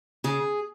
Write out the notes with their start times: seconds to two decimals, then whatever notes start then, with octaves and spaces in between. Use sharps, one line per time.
0.24 C#3 G#4